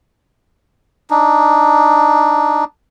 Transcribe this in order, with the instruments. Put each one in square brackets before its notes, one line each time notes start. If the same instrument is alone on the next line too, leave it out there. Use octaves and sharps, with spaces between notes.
[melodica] D4 D#4